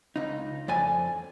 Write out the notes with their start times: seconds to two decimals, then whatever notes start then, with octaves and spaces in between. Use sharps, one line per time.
0.16 C#2 D#4
0.68 F2 D5 G#5